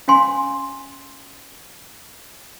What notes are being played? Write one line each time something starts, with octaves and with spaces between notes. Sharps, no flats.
C#4 F5 G#5 C6